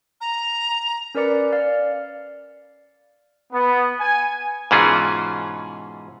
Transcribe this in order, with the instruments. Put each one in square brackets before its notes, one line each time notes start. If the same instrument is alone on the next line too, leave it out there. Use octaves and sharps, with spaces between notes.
[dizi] A#5
[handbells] C#4 A#4 B4 D5 D6 C#7
D5 F5 F6
[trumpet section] B3
G#5
[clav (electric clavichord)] G#2 B2 E3 C#4 F4 G#4